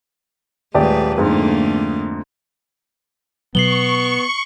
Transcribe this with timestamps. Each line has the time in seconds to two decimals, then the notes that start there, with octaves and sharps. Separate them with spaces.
0.74 D#1 G#3 A3 G4 B4 D5
1.18 F2 G#2 D3 A3 A#3
3.55 B2 F#3 B3 C#6 C7 F#7 G7